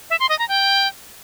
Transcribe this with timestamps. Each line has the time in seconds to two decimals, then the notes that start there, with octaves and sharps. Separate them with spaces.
0.10 E5
0.20 C6
0.29 D#5
0.39 A#5
0.48 G5